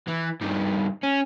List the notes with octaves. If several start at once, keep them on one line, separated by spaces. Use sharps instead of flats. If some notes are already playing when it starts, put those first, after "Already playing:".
E3
G2 D#3
C#4